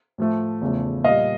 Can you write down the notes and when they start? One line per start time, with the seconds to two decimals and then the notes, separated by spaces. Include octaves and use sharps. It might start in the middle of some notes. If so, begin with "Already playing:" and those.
0.18 A2 F3 A3
0.61 E2 C#3 F3 A3
1.04 A#2 G3 D#5 F5